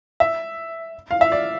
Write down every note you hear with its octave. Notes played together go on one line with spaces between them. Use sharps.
E5
F5
E5
D5